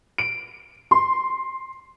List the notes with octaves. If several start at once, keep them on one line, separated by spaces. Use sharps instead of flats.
D7
C6